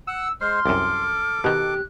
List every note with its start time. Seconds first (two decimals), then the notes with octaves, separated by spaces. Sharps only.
0.07 F#5 E6
0.41 G#3 C5 C6 F6
0.66 C2 F#2 A4 D6
1.44 B2 D#3 G4 F#6